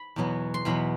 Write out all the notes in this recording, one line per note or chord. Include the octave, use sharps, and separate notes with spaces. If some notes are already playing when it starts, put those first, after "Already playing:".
Already playing: B5
E2 B2 F#3 B3
C6
E2 B2 F#3 B3 B5